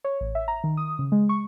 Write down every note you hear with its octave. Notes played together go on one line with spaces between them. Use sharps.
C#5
A1
E5
A#5
D#3
D#6
C#3
G#3
C#6